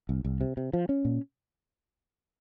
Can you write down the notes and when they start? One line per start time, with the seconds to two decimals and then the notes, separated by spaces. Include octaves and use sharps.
0.09 C2
0.25 C2
0.41 C3
0.57 C3
0.73 F3
0.89 C#4
1.05 A#2